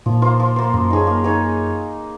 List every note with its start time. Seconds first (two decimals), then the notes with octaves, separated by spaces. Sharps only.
0.06 A#2 F3
0.22 A#3 F4 C5
0.40 F3
0.56 A#3 F4 C5
0.73 F#2 A#3
0.90 D#4 G#4 C#5
1.07 A#3
1.24 D#4 G#4 C#5